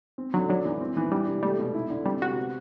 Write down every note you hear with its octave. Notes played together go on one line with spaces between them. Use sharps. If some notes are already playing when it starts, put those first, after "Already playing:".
C4
D3 F#3
F#3 D4
E3
C4
E3
G3 D4
C3
G3 A3
B2
E4
D3
G3 C4
C3 F#4
B3